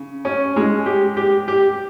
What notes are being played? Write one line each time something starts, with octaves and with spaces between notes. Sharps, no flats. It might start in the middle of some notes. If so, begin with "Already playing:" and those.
Already playing: C#3
C#4
G#3
G4
G4
G4